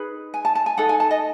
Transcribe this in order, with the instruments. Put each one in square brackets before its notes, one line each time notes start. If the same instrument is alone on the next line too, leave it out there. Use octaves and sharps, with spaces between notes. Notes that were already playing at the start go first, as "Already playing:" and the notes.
Already playing: [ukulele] D#4 G#4 B4
G#5
A5
A5
G#5
D#4 A4 F#5
G#5
A5
D#5